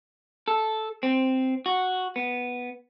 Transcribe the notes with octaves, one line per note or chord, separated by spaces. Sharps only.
A4
C4
F#4
B3